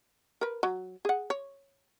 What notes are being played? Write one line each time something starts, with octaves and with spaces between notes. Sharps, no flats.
A#4 B4
F#3
G#4 F#5
C#5